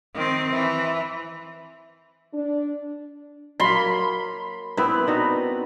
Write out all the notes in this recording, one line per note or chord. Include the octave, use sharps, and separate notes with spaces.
D#3 C4
E3
D4
F#3 A#3 B5 C6
B3 C4 E4 B4
D4 D#4 F#4